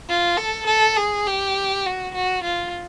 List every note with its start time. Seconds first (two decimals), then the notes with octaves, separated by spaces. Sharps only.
0.09 F4
0.38 A4
0.67 A4
0.97 G#4
1.27 G4
1.86 F#4
2.15 F#4
2.44 F4